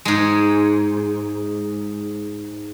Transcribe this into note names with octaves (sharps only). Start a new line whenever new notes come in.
G#2 G#3